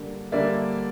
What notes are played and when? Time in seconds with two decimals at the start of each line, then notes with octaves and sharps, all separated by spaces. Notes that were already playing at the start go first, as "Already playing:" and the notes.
Already playing: D3 G3 A#3
0.32 D3 G3 A#3 D5 E5